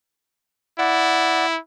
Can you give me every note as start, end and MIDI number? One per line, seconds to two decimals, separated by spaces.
0.79 1.58 64
0.79 1.46 74
0.79 1.46 78